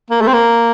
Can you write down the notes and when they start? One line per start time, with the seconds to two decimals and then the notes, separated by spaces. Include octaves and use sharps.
0.10 A#3
0.21 A3
0.28 C4
0.34 A#3